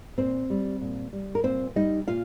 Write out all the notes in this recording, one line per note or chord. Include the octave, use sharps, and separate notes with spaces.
A#2 C4 C5
G3
A#2
G3
A#4
A#2 C4 C5
G3 D#4 D#5
A#2 F4 F5